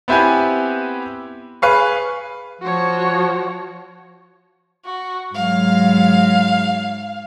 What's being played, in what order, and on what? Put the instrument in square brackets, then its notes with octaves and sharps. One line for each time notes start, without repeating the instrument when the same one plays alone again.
[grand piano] B3 C4 E4 G4 B4 G#5
G#4 B4 F5 C#6
[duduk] F3 [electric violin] F#4 C#5
[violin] F#4
[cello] G#2 F#3 [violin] F5